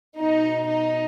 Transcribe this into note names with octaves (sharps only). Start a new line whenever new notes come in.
B2 D#4
D#4